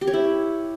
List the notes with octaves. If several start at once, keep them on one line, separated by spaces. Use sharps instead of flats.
G4
C#5
E4